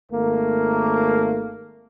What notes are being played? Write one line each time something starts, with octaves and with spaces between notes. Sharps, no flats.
G#1 A3 A#3